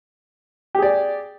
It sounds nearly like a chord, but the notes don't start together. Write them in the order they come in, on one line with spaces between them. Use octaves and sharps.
G4 G#4 D5